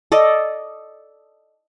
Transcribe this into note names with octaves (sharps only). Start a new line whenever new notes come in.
A4 D5 D#5